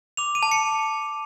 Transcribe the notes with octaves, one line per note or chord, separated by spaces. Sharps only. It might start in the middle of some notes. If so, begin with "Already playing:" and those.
D6 F7
D#7
A5
C#7